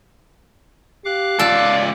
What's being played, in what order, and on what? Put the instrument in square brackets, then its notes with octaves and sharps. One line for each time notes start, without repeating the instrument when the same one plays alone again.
[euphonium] G4 [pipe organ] F5 D6 F#6
[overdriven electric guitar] C#2 D5 [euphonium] F4 [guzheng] A4